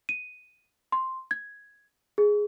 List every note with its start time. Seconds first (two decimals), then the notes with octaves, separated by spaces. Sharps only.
0.09 D#7
0.92 C6
1.31 G#6
2.18 G#4